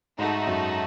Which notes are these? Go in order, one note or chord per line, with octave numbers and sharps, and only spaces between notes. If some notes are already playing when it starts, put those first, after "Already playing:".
G#2 A3 D#4 F#4
F#2